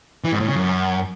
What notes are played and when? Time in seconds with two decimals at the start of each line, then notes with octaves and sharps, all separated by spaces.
0.24 E3
0.32 G#2
0.40 A2
0.48 C#3
0.56 F#2